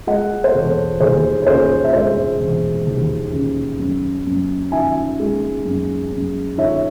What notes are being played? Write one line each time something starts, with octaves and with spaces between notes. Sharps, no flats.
G#3 D#5 F#5
C5
E1 A4 C#5
D#2 G#4 C5
C#5
C#3 G#4 C5
E5
G#3 C5 D#5
E1
D#2
C#3
F#2
F#2
D#3 E5 G#5
G#3
F#2
F#2
D#3 C#5 E5